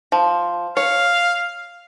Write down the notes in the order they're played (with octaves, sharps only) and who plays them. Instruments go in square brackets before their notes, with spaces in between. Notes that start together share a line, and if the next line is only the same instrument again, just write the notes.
[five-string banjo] F3
[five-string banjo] C#5 [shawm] F5